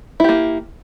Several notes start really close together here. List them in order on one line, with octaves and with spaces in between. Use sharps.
E4 G4 A#3